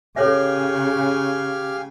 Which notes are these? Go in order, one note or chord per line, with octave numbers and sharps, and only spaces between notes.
C#3 G4 A4 C#5 E5 F5 G#5